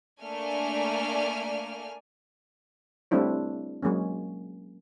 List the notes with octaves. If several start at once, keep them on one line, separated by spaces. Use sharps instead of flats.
A3 A#3 D4 D5 G#5 F6
G3 A3 C4 D4 E4 C#5
F#3 G#3 A#3 C#4